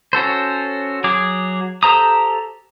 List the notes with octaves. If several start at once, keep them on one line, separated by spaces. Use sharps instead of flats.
C#4 F#4 A4 C5
F#3 G#4 D6
G4 A4 C5 A#5 D#6